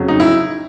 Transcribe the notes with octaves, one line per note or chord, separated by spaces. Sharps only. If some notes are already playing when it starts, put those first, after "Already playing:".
Already playing: F2 C#3 F#3
D#4
E4